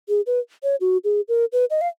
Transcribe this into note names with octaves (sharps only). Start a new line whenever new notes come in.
G#4
B4
C#5
F#4
G#4
A#4
B4
D#5
F5